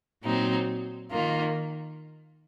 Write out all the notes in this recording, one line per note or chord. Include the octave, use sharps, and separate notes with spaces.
A#2 F#3 C4 D#4
D#3 A#3 F4